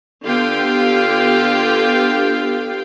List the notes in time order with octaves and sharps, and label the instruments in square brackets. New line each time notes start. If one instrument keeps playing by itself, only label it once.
[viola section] D3 B3 F4 G4 F5 G5